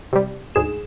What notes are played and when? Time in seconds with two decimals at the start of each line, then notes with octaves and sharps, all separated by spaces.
0.13 C3 G3
0.55 D2 G#2 G#4 E7